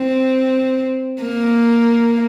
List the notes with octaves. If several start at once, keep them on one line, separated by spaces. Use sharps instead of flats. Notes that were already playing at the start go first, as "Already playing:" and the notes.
Already playing: C4
A#3